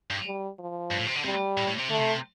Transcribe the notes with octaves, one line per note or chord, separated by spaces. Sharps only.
G2
G3
F3
G2
A2
C3
D3
C3 G3
A2
A2
C3
D3 A3
C3